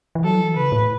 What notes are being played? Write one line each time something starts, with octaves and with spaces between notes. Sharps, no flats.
E3
F#3 A4
E3
C#3 B4
A2